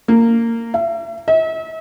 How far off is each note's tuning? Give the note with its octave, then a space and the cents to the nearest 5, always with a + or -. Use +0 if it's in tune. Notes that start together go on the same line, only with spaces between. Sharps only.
A#3 -20
E5 +35
E5 -40